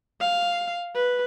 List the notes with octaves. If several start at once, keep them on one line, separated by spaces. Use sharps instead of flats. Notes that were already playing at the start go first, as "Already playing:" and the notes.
F5
B4